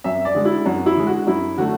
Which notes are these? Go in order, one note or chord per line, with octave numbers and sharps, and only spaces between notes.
F#2 E5
D5
D3 G#3
E4
F#2 F#4
E4
D3 G#3
F#4
F#2 E4
D3 F#3 A3 F#4